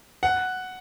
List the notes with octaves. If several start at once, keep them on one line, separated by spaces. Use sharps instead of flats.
F#5